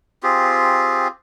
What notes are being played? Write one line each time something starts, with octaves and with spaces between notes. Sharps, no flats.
C4 F4 G4 G#4